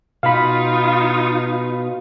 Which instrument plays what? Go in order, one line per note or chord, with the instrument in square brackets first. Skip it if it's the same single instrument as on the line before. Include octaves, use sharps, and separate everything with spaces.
[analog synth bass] B2 [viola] D#4 F4 [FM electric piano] F5 B5